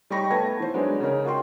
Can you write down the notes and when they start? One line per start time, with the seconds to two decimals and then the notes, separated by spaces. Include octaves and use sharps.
0.10 G3 D#4 G5 B5 C#6 A#6
0.31 A3 B3 A5 G#6 A#6
0.60 E3 C5
0.74 F#3 G#3 B3 D4 D#4
1.00 C#3 C#4 D#4 A#4
1.24 D#4 F4 F#4 G5 C6